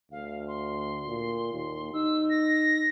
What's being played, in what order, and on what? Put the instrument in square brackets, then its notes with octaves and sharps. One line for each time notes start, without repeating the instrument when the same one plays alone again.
[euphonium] D2 [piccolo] F5
[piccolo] C6
[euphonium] A#2
D#2
[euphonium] D#4 [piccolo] E6
[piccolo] A#6